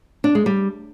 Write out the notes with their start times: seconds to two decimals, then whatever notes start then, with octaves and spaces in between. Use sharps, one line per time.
0.24 D4
0.35 G#3
0.46 G3